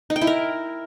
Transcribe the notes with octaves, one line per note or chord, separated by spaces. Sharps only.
D#4
G5
E4
A#4